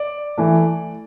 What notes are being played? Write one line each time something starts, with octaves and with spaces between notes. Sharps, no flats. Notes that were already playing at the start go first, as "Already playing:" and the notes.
Already playing: D5
E3 A3